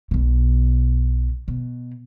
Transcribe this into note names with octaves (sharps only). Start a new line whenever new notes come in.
B1 B2
B2